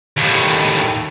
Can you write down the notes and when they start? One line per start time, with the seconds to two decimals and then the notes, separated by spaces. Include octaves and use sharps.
0.17 D#2 A2